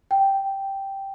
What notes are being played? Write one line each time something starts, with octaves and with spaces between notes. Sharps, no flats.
G5